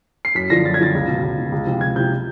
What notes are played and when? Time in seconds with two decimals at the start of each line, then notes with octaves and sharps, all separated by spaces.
0.25 C7
0.35 F#2 B6
0.50 D3 F3 A#6
0.65 F#2 A6
0.74 G#6
0.79 D3 F3 A6
0.94 C#2
1.08 B2
1.23 C#2
1.38 B2
1.52 C#2
1.66 C3 F3
1.81 C#2 G#6
1.96 C3 F3 G6